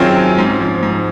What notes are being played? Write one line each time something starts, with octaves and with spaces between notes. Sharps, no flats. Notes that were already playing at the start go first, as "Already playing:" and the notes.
Already playing: F#2 D#3 F#3 C4 C#4 F4 G#4
F#2
G#2
F3
G#2